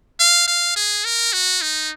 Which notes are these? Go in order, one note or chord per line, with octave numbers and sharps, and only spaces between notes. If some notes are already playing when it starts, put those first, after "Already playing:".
F5
F5
G#4
A#4
F#4
D#4